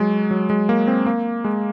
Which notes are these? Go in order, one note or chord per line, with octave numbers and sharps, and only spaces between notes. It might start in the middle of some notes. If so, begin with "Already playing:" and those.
Already playing: F#3 G#3
F#3
G#3
A#3
C4
A#3
G#3